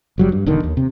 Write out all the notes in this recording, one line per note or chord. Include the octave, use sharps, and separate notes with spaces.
F#1 F#3 G3
G2
E1 E2 D3 D#3
D#2
C3